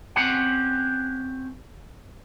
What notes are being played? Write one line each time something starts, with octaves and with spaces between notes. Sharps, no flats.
C4 C#4 G4 F#5